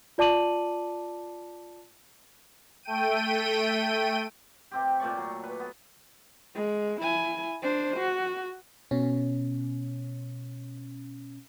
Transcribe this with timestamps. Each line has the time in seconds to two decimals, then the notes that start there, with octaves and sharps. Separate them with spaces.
0.18 F4 D5 A5 D6 D#7 F#7
2.83 A3 G5 D#7
4.71 C3 C4 G4
5.00 A#2 A3 D5 C#6
5.17 F#3
5.43 B4
5.60 B3
6.55 G#3
7.01 E4 G#5
7.62 D4 C5
7.97 F#4
8.91 B2 C#4